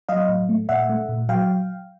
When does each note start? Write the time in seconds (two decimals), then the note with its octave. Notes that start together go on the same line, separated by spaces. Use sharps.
0.09 F#3 D#5 F5
0.29 A2
0.49 A3
0.69 A#2 E5 F#5
0.89 A3
1.09 A#2
1.29 F#3 F5 G5